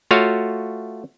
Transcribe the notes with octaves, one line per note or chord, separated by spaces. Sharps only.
A3 F4 F#4 C#5 F5